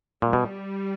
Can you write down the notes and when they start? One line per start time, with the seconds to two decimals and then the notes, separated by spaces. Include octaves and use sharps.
0.22 A#2 G3
0.33 B2